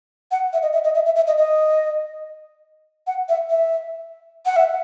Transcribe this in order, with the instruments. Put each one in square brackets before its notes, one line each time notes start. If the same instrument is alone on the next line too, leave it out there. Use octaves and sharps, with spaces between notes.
[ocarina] F#5
E5
D#5
E5
D#5
E5
E5
E5
D#5
D#5
F#5
E5
E5
F#5
E5